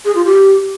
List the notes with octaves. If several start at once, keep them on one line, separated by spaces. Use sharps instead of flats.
G#4
F4
G4